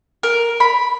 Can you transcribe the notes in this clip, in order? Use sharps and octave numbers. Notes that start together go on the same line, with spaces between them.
A#4
B5